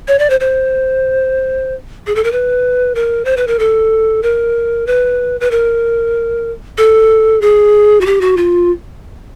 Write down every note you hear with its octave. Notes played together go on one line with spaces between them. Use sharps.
C#5
D5
C5
C5
G#4
A4
A#4
B4
A#4
C5
B4
A#4
A4
A#4
B4
B4
A#4
A4
G#4
F#4
G4
F#4
F4